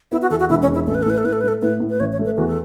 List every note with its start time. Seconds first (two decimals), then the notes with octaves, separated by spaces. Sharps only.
0.12 B3 E4
0.22 F#4
0.30 E2 A4
0.40 F#4
0.50 E1 E4
0.62 C#4
0.68 E2
0.74 E4
0.87 A1 A4
0.95 B4
1.03 A4
1.06 A2 B4
1.18 A4
1.24 A2 B4
1.33 A4
1.41 B4
1.44 A3 A4
1.62 A2 B4
1.80 A2
1.90 B4
2.00 A1 C#5
2.12 C#5
2.19 A3
2.25 B4
2.37 E2 F#4
2.47 A4